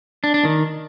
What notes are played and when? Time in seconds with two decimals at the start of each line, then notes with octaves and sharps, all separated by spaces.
0.24 D4
0.34 D4
0.45 D#3